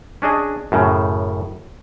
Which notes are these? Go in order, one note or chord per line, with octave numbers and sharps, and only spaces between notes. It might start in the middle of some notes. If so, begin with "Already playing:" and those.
C#4 D4 G#4 D#5
F#2 A2 C#3